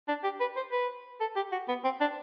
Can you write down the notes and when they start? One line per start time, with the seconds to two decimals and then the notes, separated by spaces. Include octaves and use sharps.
0.08 D4
0.24 G4
0.40 B4
0.56 C5
0.72 B4
1.20 A4
1.36 G4
1.52 F#4
1.68 B3
1.84 C4
2.01 D4